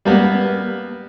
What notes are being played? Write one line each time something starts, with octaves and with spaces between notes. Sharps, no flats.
G3 A#3 B3